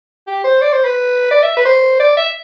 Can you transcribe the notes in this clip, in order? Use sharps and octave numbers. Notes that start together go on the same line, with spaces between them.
G4
C5
D5
C5
B4
D5
E5
B4
C5
D5
E5